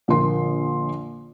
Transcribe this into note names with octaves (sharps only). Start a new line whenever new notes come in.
A#1 D3 A#4 C6